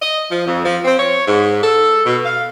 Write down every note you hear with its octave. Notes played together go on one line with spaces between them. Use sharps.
D#5
F3
F2
F3
C4
C#5
G#2
A4
B2
F5